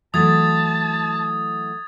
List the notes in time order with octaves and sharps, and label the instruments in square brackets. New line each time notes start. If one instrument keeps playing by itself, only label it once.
[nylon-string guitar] E3 F#3 A3 [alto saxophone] A5 [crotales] D#6 G#6 A6